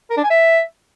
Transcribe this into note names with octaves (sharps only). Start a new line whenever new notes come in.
A#4
D4
G#5
E5